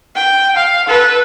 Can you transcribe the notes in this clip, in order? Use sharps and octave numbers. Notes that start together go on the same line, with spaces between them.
G5
F5
A4 B4